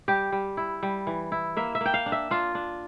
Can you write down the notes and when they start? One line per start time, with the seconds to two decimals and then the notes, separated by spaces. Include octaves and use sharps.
0.08 G3 G4
0.32 G3
0.57 E4
0.83 G3
1.07 E3
1.32 E4
1.57 A#3 E5
1.75 E5
1.81 A#3 G5
1.94 F5
2.06 D4
2.12 E5
2.31 D4 F4
2.55 D4